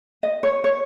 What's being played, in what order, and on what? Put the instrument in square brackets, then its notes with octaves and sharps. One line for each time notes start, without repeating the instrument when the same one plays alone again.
[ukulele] D#5
C#5
C#5